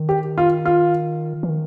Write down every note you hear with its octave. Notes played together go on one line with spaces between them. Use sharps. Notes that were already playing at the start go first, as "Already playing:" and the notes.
Already playing: D#3
G4
F4
F4
E3
D#3